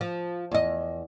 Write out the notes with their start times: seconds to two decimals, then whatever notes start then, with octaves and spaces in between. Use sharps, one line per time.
0.01 F3
0.52 E2 D#5